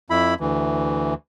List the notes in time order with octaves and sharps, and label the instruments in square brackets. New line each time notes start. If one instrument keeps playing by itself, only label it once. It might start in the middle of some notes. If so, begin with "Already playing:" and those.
[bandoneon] F2 E4 B5
D2 E3